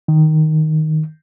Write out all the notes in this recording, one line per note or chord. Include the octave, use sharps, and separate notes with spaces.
D#3